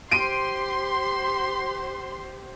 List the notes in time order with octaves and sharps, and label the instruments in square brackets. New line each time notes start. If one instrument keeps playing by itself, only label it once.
[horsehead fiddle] G4 C5 [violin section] C6 [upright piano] D7 D#7